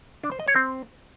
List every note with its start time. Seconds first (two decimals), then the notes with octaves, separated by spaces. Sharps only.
0.24 D4
0.32 C5
0.40 D#5
0.48 C#5
0.56 C4